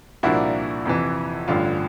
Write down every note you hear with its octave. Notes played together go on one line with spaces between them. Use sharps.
C2 A#2 F3 A#3 D4 E4 F#4
F2 C3 E3
A1 G2 D3 F4